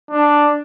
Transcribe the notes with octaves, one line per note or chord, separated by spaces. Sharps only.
D4